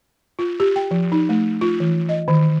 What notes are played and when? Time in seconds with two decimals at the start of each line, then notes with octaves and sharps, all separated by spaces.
0.39 F4
0.60 G4
0.76 G5
0.91 F3
1.12 D#4
1.29 A3
1.61 F4
1.80 E3
2.09 D#5
2.28 D#3